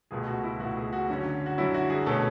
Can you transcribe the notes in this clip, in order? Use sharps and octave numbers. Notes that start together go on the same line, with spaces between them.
C#2 B2 A3 G#4
F#4
E4
C#2 B2 A3 F#4
G#4
F#4
F#2 D3 F#3 C#4
F#4
F#2 D3 F#3 C#4 E4
F#4
G#4
B2 A3 C#4 A4